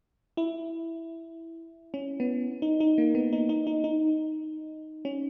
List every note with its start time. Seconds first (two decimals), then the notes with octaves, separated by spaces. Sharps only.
0.37 E4
1.94 C#4
2.20 B3
2.62 D#4
2.80 D#4
2.98 A#3
3.15 B3
3.33 D#4
3.49 D#4
3.67 D#4
3.84 D#4
5.05 C#4